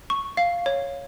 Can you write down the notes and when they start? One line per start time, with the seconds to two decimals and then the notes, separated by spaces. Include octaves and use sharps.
0.10 C#6
0.37 F5
0.66 C#5